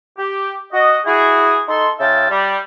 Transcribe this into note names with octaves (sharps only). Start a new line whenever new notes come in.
G4
F#4 D#5
E4 F#4 G#4
D#4 A4 C6
C#3 F4 E5 G5 A5
G3